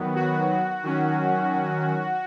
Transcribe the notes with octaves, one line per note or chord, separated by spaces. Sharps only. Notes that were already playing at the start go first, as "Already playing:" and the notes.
Already playing: D#3 F#3 B3
F#4
D#3 F#3 C#4